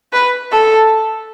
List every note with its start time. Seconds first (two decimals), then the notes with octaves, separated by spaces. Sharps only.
0.13 B4
0.52 A4